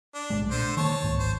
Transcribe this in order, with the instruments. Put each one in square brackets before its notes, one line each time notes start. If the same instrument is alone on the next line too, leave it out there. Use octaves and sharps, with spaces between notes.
[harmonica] D4
[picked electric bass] B1 A2 G#3
[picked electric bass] A#2 [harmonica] D3 C5
[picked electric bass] D#3 A#3 [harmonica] C#5 A5
[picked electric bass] C#2 G#2
[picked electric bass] D1 G#1 [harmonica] C5